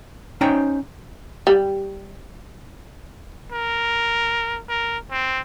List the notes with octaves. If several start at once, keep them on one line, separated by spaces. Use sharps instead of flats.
C#4 D#4 C5 C#5 G5 A#5
G3
A#4
A#4
C4